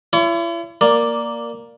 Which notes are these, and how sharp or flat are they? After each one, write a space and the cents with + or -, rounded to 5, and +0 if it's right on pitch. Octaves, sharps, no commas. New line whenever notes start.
E4 +40 C#5 +40
A#3 +0 D5 +0